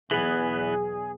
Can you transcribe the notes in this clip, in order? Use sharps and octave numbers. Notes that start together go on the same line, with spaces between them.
B1 E2 E3 B3 G#4